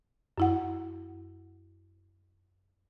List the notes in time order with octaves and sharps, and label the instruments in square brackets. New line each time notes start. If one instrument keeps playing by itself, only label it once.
[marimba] F#2 E4 F#5